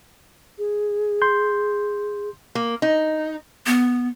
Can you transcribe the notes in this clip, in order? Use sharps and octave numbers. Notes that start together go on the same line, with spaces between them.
G#4
C6 G6
A#3
D#4
B3